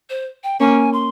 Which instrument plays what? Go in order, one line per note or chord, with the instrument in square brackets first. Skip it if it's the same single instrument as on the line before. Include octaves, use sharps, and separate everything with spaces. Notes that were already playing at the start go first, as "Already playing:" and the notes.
[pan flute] C5
G5
[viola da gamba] A#3 C#4 [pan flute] G#5
[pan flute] C6